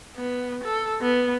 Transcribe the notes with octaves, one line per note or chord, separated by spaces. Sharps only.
B3
A4
B3